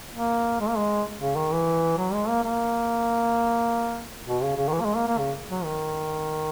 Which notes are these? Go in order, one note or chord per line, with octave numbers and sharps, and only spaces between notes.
A#3
G#3
A#3
G#3
C#3
D#3
E3
F#3
G#3
A#3
A#3
B2
C#3
C#3
D#3
E3
A#3
G#3
A#3
A#3
C#3
F#3
D#3